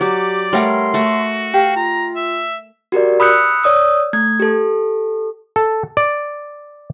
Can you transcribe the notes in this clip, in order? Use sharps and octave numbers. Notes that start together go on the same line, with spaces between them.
F#3 G4 D5
G3 A3 A#4 C#5 F#5 C6
A3 F#4
G4 F5
F4 A#5
E5
F#4 G4 A#4 D5
B5 D#6 E6 F#6 G6 C#7
C#5 D5 D#6 E6
A3 G#6
G4 A4
A4
D5